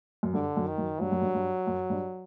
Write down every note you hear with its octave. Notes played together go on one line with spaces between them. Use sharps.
F#2
G2 D3
F#2
D#3
F#2
G2 F#3
F#2
G2
G2
F#2
G2